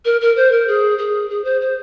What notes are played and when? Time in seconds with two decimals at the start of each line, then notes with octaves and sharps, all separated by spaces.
0.05 A#4
0.21 A#4
0.36 C5
0.52 A#4
0.68 G#4
0.98 G#4
1.30 G#4
1.44 C5
1.61 C5